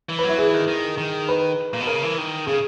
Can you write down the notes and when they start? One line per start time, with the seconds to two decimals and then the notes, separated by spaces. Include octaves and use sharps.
0.09 E3
0.19 F#3 B4
0.29 E4
0.38 E3 G#4
0.54 D#3
0.68 D#3
0.98 D#3
1.29 B4
1.73 A#2
1.80 B2
1.87 C#3 A#4
2.03 E3
2.18 D#3
2.47 C#3 G#4